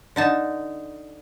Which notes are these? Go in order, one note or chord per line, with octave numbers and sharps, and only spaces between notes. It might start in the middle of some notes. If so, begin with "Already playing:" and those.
D3 D#4 A5